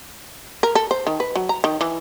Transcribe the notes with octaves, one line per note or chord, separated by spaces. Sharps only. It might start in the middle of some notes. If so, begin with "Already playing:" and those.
A#4
A4
C5
D#3
B4
F#3
A#5
D#3
E3